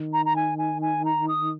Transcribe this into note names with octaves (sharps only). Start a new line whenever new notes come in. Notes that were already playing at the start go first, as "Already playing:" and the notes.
Already playing: D#3
A#5
A#5
G#5
G#5
G#5
A#5
D#6